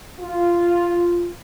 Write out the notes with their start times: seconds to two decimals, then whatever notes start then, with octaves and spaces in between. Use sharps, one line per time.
0.20 F4